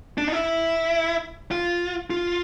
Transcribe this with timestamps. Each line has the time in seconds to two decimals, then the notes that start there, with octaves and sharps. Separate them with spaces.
0.18 D4
0.28 D#4
0.32 E4
1.51 F4
2.10 F4